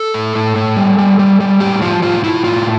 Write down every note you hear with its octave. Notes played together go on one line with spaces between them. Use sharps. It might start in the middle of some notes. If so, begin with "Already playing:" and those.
Already playing: A4
A2
A2
A2
G3
G3
G3
G3
A2 G4
F3 F4
A2 F4
A2 E4
A2 F4